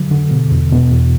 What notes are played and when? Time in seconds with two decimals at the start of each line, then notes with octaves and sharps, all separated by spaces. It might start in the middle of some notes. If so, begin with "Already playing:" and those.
Already playing: D3 F#3
0.11 D3
0.31 B2
0.51 E2
0.72 B2
0.92 E2